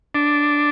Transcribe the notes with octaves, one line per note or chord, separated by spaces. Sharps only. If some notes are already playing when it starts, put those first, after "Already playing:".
D4